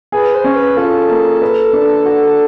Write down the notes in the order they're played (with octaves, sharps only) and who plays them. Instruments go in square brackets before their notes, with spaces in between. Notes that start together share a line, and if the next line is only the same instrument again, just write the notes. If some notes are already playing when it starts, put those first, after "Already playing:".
[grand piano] G#4 [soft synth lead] B4
[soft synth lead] C5
[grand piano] C#4
[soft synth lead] B4
[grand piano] F4 [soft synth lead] A4
[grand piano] A#3
B4
D4
F#4